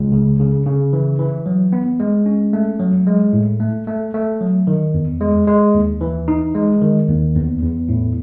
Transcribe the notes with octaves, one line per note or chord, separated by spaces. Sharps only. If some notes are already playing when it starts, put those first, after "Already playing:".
Already playing: C#2
C#3
C#3
C#3
E3
E3
F#3
B3
G#3
C#4
A3
F#3
G#3
A2
A3
A3
A3
F#3
D#3
E2
G#3
G#3
D#2
E3
D#4
G#3
D#3
D#2
E2
E2
A2